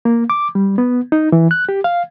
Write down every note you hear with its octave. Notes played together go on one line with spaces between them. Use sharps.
A#3
D6
G3
B3
D#4
E3
F#6
G4
F5